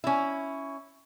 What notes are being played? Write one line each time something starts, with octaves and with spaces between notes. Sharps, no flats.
C#4 E4